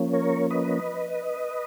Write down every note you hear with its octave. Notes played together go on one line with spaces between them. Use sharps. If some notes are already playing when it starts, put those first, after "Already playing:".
Already playing: F3 A#3 C#4
A#4 C#5
B4 D#5